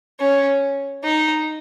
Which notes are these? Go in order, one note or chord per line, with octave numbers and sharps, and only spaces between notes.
C#4
D#4